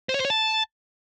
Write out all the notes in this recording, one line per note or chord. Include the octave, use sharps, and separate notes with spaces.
C5
C#5
C5
C#5
A5